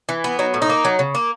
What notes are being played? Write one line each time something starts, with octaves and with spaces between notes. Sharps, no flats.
E3
B3
F#3 D#4
A2
D#4
A#3
F#3
C#3
A#3